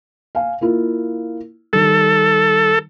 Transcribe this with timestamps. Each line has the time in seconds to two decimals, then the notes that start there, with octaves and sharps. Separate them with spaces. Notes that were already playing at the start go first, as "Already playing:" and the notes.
0.35 F5 G#5
0.61 A#3 E4 F4
1.73 D#3 G3 A4